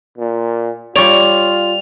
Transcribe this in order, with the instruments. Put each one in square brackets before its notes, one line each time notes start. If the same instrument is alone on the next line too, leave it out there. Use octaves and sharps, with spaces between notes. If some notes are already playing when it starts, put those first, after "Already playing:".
[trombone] A#2
[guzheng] G3 D5 [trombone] F4 [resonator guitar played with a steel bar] C#5 [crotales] F7